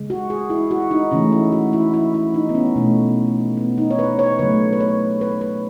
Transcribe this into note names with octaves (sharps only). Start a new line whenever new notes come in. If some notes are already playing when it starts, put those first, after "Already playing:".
Already playing: C#3 G#3
F#4
G#4
E4
F#4
D#4
C#3 E3 A3 C#4
E4
F#4
E4
E4
E4
D#4
B3
C#4
B2 A3
B3
D#4
C#5
B4
C#5
C#3 F#3 A3 B4
B4
C#5
B4
B4